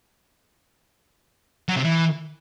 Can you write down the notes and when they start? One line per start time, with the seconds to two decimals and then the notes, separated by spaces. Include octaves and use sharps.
1.68 F#3
1.76 C3
1.84 E3